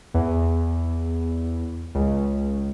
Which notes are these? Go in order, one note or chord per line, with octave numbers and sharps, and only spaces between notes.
E2
C#2